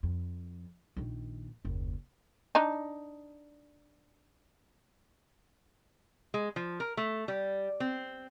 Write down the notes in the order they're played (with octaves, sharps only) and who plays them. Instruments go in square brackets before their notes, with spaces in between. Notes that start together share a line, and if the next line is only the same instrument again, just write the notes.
[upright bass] F2
A#1 D#3
F#1 D#2
[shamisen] D4 D#4
[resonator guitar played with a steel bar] G#3
F3
A#4
A3
G3
C4